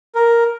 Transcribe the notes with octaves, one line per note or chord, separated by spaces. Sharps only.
A#4